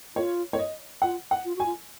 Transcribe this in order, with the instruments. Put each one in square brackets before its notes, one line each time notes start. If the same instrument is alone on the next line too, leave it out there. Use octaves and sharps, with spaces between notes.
[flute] F4 [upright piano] C#5
[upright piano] C#5
D#5
[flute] F4 [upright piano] F#5
[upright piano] F#5
[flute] F4
[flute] F#4 [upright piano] G#5
[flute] F4